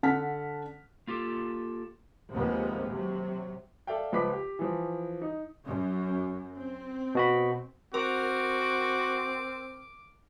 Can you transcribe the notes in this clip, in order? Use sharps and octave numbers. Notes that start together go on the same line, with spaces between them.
D3 F#5 A5 F6 B6
A#3 F4 G4 A4
D#2 C3 F3 G#3 A#3 B3
C3 F#3
A4 D5 E5 F5 G5
C#2 F3 B4 B5 D6 B6
G4
E3 F3
D#4
F#2
C4
B2 F#4 B5
C4 F#4 A#4 D6